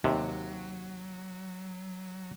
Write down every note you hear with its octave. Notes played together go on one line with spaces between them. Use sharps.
D#2 C3 F#3